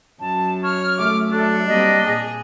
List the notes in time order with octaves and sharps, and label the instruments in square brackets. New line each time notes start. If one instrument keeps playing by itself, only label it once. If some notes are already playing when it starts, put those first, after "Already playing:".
[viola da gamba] F#2 [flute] A5
[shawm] C#5 [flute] F6
[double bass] A3 [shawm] D6
[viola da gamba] F#3 [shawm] D4 [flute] A4
[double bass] G3 [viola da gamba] A#3 C4 [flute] D#5
[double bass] A#2 [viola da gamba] G#4